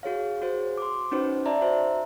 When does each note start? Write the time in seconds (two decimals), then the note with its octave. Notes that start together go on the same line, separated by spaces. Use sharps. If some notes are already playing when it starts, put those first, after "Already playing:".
0.03 F#4 G#4 C#5 F5
0.42 F#4 G#4 C5
0.78 C6 D6
1.12 C#4 D#4 F#4 B4 C5
1.46 D5 E5 A5 A#5
1.61 F#4 C5 E5